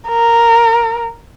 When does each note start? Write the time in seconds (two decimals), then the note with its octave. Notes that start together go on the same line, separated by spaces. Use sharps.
0.09 A#4